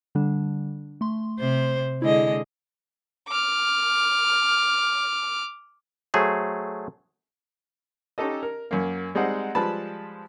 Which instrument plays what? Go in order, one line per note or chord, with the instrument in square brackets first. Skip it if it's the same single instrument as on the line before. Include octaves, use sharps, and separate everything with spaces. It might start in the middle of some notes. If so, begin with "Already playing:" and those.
[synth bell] D3 G3 D4
A3 C6
[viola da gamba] C3 C5
[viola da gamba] D3 G#3 D#5 [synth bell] E4
[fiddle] D6 F6
[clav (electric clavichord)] F#3 A3 G#4 C5
[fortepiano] C#4 D#4 G4 A4 D#5
A#4
F#2 A#3
G3 G#3 C4 D#4 C5 F#5
F3 G3 G#3 B4 A5 B5